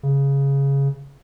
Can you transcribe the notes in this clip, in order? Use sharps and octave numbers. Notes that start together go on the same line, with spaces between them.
C#3